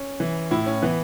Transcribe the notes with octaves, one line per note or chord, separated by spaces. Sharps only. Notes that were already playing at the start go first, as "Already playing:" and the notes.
Already playing: C#4
E3
A2 E4
C#4
E3 B3